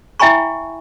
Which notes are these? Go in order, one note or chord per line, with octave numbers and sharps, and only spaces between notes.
E4 E5 G5 G#5 B5 C#6